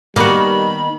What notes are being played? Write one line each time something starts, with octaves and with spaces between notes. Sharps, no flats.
D#3 G3 A#3 B3 F#4 B5